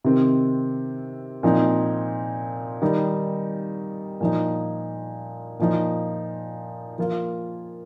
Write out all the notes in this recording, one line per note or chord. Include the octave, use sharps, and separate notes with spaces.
C3 D#3 C4
A#2 F3 C4 D#4
D#3 G3 D#4
A#2 F3 D#4
A#2 F3 D#4
F3 A#3 F4